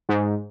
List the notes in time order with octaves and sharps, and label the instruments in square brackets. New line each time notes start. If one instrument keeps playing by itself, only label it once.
[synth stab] G#2